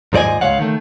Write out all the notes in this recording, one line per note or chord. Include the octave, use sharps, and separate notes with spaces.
D#2 G#2 F3 D5 D#5 G#5
C#2 G#2 G#3 C#5 F5 F#5
D#3 A3